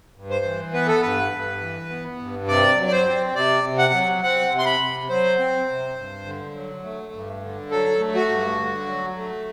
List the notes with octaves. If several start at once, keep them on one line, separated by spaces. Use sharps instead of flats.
G2
C5
E3
B3 B4
A4
G2 B4
G2
E3
B3
G2
C3 D5
F#3
D5
C5
C4
C3 D5
C3
F#5
F#3
C4 F#5
C3
C6
B5
C3
F#3 C5
C4
C3
G2
D3
F#3
A3
G2
D3
F#3 A4
A3
F#4
G2
D3
F#3
A3